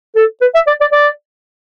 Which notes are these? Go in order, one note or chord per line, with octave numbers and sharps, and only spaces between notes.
A4
B4
E5
D5
D5
D5